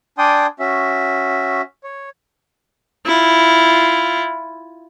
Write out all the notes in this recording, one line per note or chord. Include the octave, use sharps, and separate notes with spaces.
D4 D5 G5 G#5 C6 D#6
C#4 F#4 E5
C#5
E4 F4